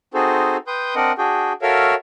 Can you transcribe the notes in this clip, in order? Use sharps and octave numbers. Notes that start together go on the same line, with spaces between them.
C4 D#4 F#4 G#4 A4 C5
B4 G5 C6 D#6 G6
C4 D4 A#4 D#5 F#5
D4 F#4 G#4 G5
F#4 A4 A#4 C#5 E5 F5